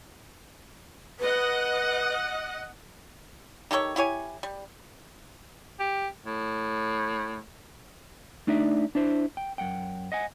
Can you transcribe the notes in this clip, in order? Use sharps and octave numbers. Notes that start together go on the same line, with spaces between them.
B4 D#5 F#5
D#3 G4 A4 C#5
E4 G4 C#5 G#5
G3
G4
A2
A3 D4 D#4 D5 E5
D4 E4 C5
G5
F#2 F#5 G5
D#5 F#5 G#5